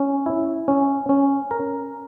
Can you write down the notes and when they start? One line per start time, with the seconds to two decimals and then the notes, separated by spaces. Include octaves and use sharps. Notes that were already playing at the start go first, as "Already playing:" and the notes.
Already playing: C#4
0.26 E4
0.68 C#4
1.09 C#4
1.51 A#4